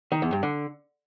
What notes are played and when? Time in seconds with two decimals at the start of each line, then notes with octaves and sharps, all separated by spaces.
0.12 D#3
0.22 E2
0.32 G2
0.43 D3